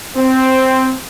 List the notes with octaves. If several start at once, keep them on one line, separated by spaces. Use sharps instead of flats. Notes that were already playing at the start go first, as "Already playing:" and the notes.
C4